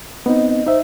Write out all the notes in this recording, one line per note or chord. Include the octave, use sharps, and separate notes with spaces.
B3 C4 D#4 D#5
D#5
D#4 C5 E5